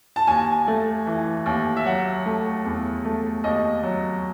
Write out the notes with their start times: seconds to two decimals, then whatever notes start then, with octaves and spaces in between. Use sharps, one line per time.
0.16 A5
0.27 D#2 G#5
0.67 A3
1.07 E3
1.46 D#2
1.76 E5
1.85 F#3 F#5
2.26 A3
2.65 E2
3.05 A3
3.44 D#2 D#5
3.83 F#3